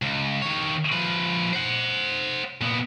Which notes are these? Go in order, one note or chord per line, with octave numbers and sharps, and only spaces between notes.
C#2
D#3 C#5
F3 B4
C5 F#5
A#2 B3